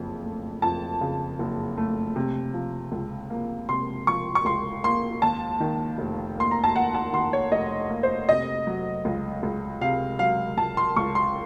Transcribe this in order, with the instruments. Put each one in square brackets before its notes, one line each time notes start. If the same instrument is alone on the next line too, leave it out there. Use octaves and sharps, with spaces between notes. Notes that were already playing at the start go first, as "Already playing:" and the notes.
Already playing: [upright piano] F#1 F2 C#3
A3
F2 A5
C#3
F#1
A3
C3
F3
C#2
A#3
C3 C6
F3 C#6
C#6
C#2 C6
A#3 C6
D#2 A5
D#3
F1
A#3 C6
A#5
A5
D#2 F#5
A5
D#3 C6
C#5
F1 D#5
A#3
C5
C3 D#5
F#3
C#2
C#2
C3 F5
F#3 F5
C#2 A5
C6
C#2 C#6
C6